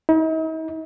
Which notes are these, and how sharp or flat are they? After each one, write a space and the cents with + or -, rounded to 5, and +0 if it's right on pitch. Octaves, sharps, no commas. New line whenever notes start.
D#4 +45